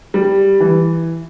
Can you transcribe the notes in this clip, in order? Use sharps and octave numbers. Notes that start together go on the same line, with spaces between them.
G3
E3